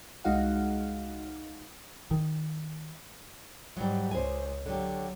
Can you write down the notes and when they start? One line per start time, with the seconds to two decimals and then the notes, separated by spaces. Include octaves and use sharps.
0.24 C2 G#3 D#4 F#4 F5 F#5
2.11 D#3
3.77 G#2 F#3 G3
4.11 C#2 C5 G#5
4.66 D3 F#3 G4